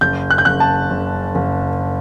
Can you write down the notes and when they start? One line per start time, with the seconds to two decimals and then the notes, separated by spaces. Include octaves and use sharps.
0.01 F#1 G6
0.31 F#6
0.38 G6
0.45 F#1 F#6
0.60 A5
0.90 F#1
1.35 F#1